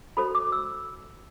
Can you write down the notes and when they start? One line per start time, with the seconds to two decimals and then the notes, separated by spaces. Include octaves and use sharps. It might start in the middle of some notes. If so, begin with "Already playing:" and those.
0.17 F#4 A4 C5 B5
0.35 D6
0.52 E6